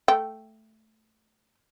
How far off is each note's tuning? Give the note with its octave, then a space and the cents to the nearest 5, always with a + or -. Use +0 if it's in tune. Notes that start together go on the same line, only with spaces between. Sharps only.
A3 +0 G5 -5